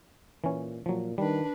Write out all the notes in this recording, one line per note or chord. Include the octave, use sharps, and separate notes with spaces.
A#2 E3 C#4
A#2 F3 F#3
D#3 G3 D4 B4